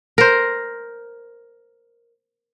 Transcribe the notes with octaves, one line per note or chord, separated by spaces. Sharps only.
A#4 C5